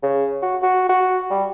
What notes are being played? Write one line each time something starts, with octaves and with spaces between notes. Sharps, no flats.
C#3
F#4
F#4
F#4
G3